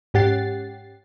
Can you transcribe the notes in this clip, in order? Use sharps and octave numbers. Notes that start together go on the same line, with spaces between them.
G#2 C#4 G4 F#5 A6 C7